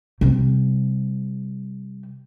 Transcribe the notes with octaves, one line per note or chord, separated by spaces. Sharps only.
C3 G3